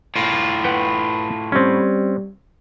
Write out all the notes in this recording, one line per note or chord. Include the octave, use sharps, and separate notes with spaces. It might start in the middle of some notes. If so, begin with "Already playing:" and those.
A2 F4
B4 F#5 G5
G3 C4 C#4